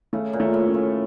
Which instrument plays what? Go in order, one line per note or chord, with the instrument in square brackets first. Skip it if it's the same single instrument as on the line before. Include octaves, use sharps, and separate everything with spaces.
[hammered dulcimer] C#3 [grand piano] A3
[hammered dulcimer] A#2
[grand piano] A3
[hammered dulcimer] A2
[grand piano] C#4
[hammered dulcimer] A2